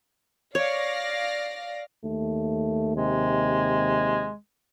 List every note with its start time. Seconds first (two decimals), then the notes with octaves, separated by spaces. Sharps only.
0.55 C#5 D5 F5 A#6
2.04 D#2 A3
2.97 C3 G#3